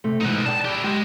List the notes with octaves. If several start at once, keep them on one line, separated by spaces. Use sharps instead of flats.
C3 A3
G#2 B2 E3 D#4 B4
D5 G5 A5
E4 G4
G#3 G4 G5